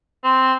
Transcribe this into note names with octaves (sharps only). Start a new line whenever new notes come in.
C4